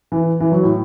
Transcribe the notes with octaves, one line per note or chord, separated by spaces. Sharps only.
E3
E3
F#3
A2